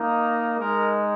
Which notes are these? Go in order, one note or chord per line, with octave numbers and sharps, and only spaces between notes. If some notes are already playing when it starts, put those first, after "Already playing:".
Already playing: A#3 D#4
G#3 D#4 A#4